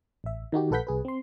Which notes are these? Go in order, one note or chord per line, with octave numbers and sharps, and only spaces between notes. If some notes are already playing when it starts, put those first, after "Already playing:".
A1 E5
D#3 D#4 F#4 G4
A#1 A4 B4 F#5 G6 B6
C2 G#4 B4
C4 C6